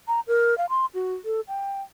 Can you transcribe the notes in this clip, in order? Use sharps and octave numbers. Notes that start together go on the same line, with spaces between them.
A#5
A#4
F5
C6
F#4
A4
G5